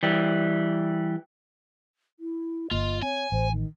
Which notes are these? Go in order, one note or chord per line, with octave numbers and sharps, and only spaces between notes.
E3 G3
E4
G1 A#3 F4 D#5
C4 C#5 G#5
A1 C5
D#3